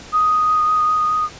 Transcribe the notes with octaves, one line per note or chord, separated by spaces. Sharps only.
D#6